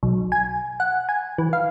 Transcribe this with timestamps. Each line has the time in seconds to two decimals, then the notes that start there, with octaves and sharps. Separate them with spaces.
0.03 B1
0.32 G#5
0.80 F#5
1.09 G#5
1.38 E3
1.53 F5